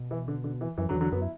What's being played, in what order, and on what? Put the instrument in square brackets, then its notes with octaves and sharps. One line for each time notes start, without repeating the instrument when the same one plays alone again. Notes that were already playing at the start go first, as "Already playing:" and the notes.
Already playing: [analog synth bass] B2
[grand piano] E3
D3
D3
E3
[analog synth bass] F#2 [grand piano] E3
[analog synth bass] F#2 [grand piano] D3 F#3
[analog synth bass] E2
[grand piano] D3 F#3
[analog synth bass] F#2 [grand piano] F#3 B3
[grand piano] E4